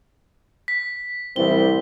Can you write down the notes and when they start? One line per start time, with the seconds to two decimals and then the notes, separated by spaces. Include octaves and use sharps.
0.68 B6
1.36 C2 A2 E3 C4 D5 G7